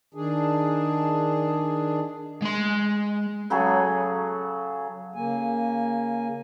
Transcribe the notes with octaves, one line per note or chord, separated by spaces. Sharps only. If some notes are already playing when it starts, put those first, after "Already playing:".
D#3 D4 G#4
G#3 C6
C#3 F#3 G#4 A4
C#3 A#3 G#5